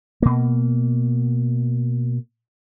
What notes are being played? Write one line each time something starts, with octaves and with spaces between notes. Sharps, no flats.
B2 A#3